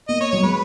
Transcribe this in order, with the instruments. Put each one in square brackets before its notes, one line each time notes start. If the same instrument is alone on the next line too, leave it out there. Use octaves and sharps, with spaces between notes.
[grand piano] A#3 [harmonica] D#5
[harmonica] C#5
[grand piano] F#3 [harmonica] C#5
[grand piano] G#3 [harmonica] B4